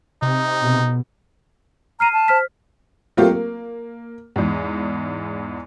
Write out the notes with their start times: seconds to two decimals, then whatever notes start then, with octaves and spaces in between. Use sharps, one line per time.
0.22 C3 D#4
0.62 B2
2.00 A#5 F6 C7 D#7
2.13 A5
2.28 C5 F6 B6
3.17 F#3 A3 A#3 C4 F4 G4
3.30 A#3
4.36 E2 G#2